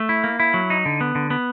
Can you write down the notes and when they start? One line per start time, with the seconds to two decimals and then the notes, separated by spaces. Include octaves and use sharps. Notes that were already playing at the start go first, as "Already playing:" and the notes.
Already playing: A3
0.09 E4
0.24 A#3
0.40 E4
0.54 F#3
0.70 D#4
0.85 D3
1.01 B3
1.15 D3
1.30 B3